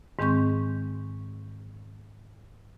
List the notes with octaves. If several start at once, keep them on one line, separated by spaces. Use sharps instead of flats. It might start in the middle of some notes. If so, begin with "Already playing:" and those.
G#2 D#3 G#3 C4 C#6 G6